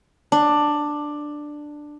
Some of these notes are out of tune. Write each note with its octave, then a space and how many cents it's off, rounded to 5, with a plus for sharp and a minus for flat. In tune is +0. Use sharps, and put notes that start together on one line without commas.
D4 +10